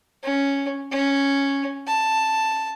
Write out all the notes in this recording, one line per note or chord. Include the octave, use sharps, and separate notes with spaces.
C#4
C#4
A5